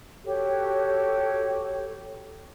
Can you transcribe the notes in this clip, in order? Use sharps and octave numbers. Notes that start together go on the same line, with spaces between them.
F#4 G4 A4 C#5